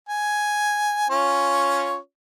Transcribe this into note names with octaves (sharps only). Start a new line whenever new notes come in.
G#5
C#4 F4 C#5